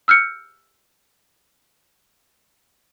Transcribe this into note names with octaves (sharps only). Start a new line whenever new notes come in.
E6 F6 G6 C#7